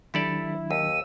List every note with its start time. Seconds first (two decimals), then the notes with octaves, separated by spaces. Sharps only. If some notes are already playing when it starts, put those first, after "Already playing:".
0.14 D#3 F#3 D4 E4 G4 A4 D5
0.71 D#2 E6 D#7